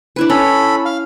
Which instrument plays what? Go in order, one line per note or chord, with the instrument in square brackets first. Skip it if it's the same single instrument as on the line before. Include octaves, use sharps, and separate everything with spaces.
[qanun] D4 E4 B4
[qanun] C#4 [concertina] A4 B5
[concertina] F5